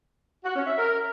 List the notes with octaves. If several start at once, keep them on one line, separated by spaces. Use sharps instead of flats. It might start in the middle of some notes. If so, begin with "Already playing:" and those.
F#4
C#4
E5
A#4